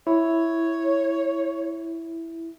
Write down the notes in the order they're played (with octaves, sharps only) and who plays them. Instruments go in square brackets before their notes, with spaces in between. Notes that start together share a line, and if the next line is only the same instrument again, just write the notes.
[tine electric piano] E4 [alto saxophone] C#5